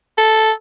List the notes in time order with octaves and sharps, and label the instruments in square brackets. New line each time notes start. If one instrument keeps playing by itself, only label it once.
[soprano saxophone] A4